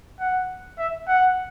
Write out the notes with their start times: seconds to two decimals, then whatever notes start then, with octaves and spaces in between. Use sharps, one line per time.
0.20 F#5
0.78 E5
1.07 F#5